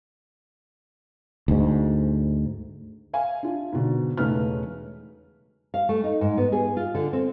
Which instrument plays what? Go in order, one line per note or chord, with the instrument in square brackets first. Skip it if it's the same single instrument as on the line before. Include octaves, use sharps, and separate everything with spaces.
[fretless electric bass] D2 G#2
[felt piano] E5 F5 G#5
D4 F4
G#2 B2 D3
E1 C#3 A3 D#4 B4 F6
[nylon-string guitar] F5
A3
D#4
G#2
B3
G#4
F4
D3
C4